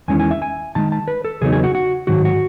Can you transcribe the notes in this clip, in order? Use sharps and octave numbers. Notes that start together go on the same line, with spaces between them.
E2 D#3 G#3 C#4 E4 G#5
G#5
E5
G#5
G#2 D#3 G#3 A5
A5
B4
A4
E2 C#3 F#3 B3 D#4 G#4
G#4
F#4
F#4
G#2 D#3 F#3 F#4
F#4